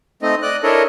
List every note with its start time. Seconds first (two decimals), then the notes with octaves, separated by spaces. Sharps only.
0.22 A3 C4 D#4 D#5
0.42 D5 D#5 F#6
0.63 D4 E4 A4 A#4 C#5 D#5